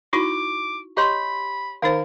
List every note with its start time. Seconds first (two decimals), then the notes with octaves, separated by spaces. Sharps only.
0.13 D#4 E4 F#4 C#6 D6
0.97 G4 C#5 D#5 B5 C6
1.82 D#3 D#4 A#4 C5 F5